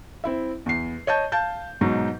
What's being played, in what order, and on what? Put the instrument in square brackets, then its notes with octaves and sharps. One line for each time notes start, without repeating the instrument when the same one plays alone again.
[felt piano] C4 E4 E5
E2 C7
C#5 D#5 A5 G6
F5 A5 G6
G#2 B2 F#3 D#4